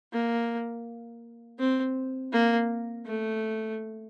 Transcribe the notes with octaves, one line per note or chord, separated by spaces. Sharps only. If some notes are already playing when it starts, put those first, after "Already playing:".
A#3
C4
A#3
A3